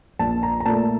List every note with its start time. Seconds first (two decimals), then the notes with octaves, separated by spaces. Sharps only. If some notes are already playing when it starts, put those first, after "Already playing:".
0.19 A#1 A5
0.43 A#5
0.60 A#5
0.65 A#2 A3 A5